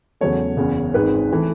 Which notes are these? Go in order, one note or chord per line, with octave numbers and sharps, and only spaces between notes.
E2 C#3 F#3 A3 C#5
F#1 E2 C#3
G#1 G#2 D#3 G#3 B4
E3 A3